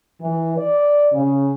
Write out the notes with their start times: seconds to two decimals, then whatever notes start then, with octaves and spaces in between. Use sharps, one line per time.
0.22 E3
0.58 D5
1.13 C#3